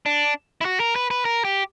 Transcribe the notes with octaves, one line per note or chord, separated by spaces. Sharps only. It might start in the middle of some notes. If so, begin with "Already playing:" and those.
D4
E4
F#4
A#4
B4
B4
A#4
G4